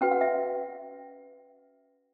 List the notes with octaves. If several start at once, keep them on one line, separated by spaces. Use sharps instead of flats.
C#4 F#4 B4 G5
F#5
E5 G5